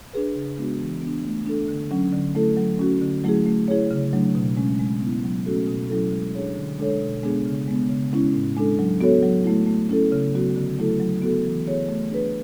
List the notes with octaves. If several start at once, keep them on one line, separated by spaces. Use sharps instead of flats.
D4 G#4 B4
C#3
G#3 B3 D4 F#4
E3
B3
D4
A3
D4 A4
D3
F#3 C#4
D3
A3 E4 A4
F#3
C#4 F#4
D3
F#3 A3 E4 G#4
A3
E4 G#4 C#5
C#3
F#3 A3 D4
B2
G#3 C#4
G#3
B3 E4
F#3
A3 C#4 F#4 A4
B2
F#3 C#4 E4 A4
G#3
D4 G#4 C#5
D3
G#3 D4 A4 C#5
B2
G#3 B3 D4 G#4
C#3
G#3 B3
C#3
G#3 C#4 E4
A2
G#3 D4 A4
F#3
B3 F#4 A4 C#5
F#3
A3 E4
A3
C#4 E4 A4
C#3
F#3 B3 F#4
D3
F#3 A3 E4 A4
F#3
B3 F#4 A4
E3
B3 E4 G#4 C#5
A3
D4 G#4 B4